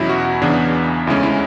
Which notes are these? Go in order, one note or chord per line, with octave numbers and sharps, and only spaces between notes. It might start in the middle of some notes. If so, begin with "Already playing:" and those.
Already playing: E2 B2 F#3 C#4 E4
F#4
E2 C#3 E3 B3 D4
D2 C#3 G#3 C#4 E4
E4